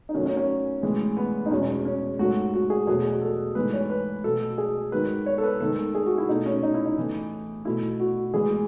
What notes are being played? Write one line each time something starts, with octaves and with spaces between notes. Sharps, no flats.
D#4
F#2 D#3 F#3 A3 C#4
C#4
C#4
A2 E3 G#3
B3
D#4
E2 B2 G#3 C#4
C#4
C#4
G#2 F#3 A3 F#4
F#4
G#4
E2 B2 F#3 A3 G#4
A4
G#2 E3 A3 B4
C#5
B4
B2 F#3 A3 A4
G#4
G#2 D#3 F#3 B4
C#5
A4
B4
G#2 D#3 A3 A4
G#4
F#4
E4
B2 A3 D#4
C#4
D#4
E4
D#4
A2 E3 A3
B2 A3 E4
F#4
A2 E3 G#3 G#4